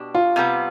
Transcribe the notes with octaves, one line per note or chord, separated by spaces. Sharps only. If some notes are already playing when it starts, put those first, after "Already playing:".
Already playing: B2 D4 G4
F4
C3 G3 B3